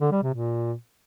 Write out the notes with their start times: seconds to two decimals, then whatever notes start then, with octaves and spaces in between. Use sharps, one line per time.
0.01 D3
0.12 G3
0.23 C3
0.34 A#2